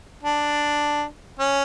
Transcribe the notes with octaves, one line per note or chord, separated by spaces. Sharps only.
D4
C#4